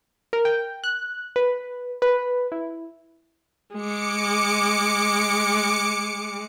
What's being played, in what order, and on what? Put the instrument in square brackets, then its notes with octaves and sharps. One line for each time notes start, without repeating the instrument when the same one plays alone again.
[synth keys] A#4
G5
F#6
B4
B4
E4
[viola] G#3 [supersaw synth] D6 C#7